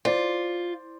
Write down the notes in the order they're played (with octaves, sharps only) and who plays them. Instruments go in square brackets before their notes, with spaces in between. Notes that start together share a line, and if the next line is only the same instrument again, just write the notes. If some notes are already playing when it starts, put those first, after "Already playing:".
[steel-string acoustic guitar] F4 [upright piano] C5 D5